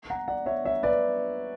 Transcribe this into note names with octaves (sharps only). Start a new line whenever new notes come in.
F#5 A#5
D5 F#5
C#5 E5
C#5 E5
B4 D5